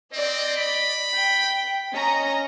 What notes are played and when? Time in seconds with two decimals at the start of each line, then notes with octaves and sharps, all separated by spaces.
0.13 C4 D5 D#5
0.57 B5
1.13 G5
1.93 C#4 D#5 A#5